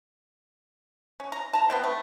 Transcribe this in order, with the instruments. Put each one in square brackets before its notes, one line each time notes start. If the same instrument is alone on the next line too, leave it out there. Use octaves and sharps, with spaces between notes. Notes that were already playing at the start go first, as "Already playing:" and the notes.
[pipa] C#4
A#5
A5 A#5
B3 C4 G5
A3